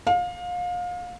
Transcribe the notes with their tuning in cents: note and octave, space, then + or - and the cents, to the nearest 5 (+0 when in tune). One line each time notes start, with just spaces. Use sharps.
F5 +30